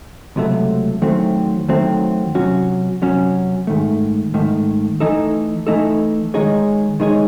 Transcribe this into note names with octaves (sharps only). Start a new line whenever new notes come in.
C#2 C3 F#3 A3
E2 D#3 F#3 A3 C4
E2 D#3 F#3 A3 C4
C3 F#3 C#4 F#4
C3 F#3 C#4 F#4
G#2 D#3 A3
G#2 D#3 A3
E3 A3 D#4 A4
E3 A3 D#4 A4
D#3 G#3 D#4 G#4 C#5
D#3 G#3 D#4 G#4 C#5